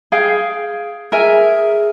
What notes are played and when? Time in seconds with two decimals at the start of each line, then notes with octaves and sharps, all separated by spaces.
0.12 G#4 F5 G5
1.12 G#4 A#4 E5 G#5